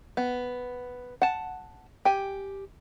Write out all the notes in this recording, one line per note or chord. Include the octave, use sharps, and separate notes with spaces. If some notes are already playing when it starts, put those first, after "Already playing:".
B3
F#5 A5
G4 G#5